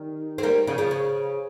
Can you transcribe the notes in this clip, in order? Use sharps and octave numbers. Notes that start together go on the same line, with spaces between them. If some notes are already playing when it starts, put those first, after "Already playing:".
Already playing: D#3 G3
C4
G3 A#3
C#3 F3
C#3 F3
C#3